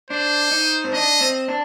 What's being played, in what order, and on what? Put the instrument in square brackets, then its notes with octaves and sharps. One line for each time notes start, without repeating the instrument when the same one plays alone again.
[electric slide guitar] D4 [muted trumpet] C5
[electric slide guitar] D#4
C4
[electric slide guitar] D4 [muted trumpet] D#5
[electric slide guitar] C4
D4